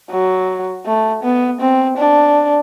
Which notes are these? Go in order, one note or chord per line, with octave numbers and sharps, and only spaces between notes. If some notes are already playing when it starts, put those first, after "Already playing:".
F#3
A3
B3
C4
D4